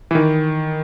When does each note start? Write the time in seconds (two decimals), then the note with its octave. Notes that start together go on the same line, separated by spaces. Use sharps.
0.11 E3
0.15 D#3